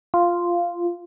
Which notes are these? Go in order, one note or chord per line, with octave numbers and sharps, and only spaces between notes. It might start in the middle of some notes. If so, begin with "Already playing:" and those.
F4